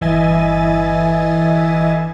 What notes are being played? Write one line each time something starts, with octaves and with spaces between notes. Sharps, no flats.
G1 E3 D#5 E5 G#5 A6